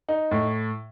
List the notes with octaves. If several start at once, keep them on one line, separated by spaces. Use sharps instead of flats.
D#4
A2